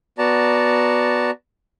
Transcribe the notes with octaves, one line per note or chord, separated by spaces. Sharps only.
B3 F#4 D5 A5 A#5